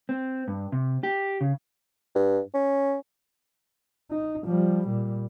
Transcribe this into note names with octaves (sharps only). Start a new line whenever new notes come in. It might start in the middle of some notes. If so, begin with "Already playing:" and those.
C4
G2
C3
G4
C#3
G2
C#4
D#4
F3 G3
A#2 G3